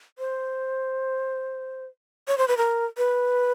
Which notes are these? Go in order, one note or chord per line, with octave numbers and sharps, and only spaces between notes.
C5
C#5
C5
B4
A#4
B4